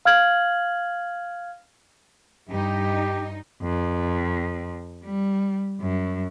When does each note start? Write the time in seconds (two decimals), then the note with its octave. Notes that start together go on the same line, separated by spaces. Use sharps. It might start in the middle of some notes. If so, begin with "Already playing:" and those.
0.05 F5 F6 G#6 F#7
2.49 G2 D#4 G4
3.62 F2
5.04 G3
5.81 F#2